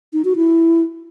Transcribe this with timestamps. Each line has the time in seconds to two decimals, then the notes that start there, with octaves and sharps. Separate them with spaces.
0.13 D#4
0.25 F#4
0.36 E4